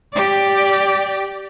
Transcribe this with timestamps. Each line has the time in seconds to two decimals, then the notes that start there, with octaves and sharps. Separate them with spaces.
0.13 G4 D5